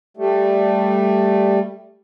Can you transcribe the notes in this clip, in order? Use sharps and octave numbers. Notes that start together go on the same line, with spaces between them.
G3 A3